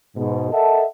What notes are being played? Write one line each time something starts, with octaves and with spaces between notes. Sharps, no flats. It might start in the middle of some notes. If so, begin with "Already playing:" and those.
G#2 B2
A4 A#4 D#5 E5 F#5 A5